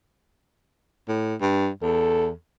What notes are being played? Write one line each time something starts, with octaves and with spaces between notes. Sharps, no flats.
A2
G2
E2 A4